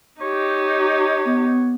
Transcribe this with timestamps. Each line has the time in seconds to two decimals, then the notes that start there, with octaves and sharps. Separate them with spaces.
0.21 D#4 G4 C#5
1.26 B3